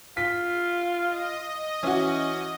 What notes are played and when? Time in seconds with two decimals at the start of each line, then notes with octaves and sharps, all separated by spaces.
0.17 F4 B6
1.04 D#5
1.83 E3 C#4 F#4